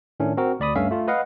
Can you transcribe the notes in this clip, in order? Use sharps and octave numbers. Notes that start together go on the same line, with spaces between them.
A2 D#3 A3 C#4 D4
C4 F#4 A#4
D2 D5 B5 D#6
G2 A3 C#4 E5 F5 B6
A3 F4
B4 D#5 F5 F#5